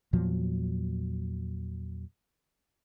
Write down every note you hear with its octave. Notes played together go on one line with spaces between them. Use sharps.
E2 A#2 F3 F#3